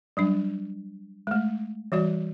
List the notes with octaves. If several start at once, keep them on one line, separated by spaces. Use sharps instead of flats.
F#3 G3 D4
G#3 A3
E3 G3 F#4 D5